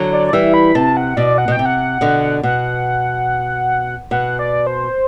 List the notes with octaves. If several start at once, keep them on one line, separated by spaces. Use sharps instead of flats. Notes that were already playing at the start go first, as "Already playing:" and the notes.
Already playing: D3 F#3
D5
D5
E3 G3 E5
B5
C3 A5
F#5
B2 D5
F#5
B2 G5
C3
F#5
B2 D3
B2 F#5
B2 F#5
D5
C5